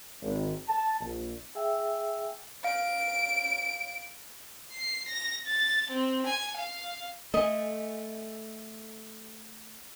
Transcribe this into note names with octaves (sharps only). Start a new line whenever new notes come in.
G#1
A5
A#1
G#4 E5 F5 G5 G#5 E6
F5 D7
C7
A#6
A6
C4
G#5
F5
A3 A4 D#5 E5 G#5